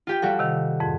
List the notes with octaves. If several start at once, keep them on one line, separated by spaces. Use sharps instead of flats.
F4 G4 G5
G3 F#4 A4 F5
C3 D#3
F2 G#2